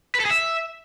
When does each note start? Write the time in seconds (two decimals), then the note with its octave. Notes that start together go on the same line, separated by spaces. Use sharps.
0.15 B4
0.20 A4
0.25 G#4
0.31 E5